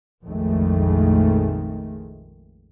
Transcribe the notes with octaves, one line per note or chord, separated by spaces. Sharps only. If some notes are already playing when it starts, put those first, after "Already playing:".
A#1 F2 D#3 G#3 A3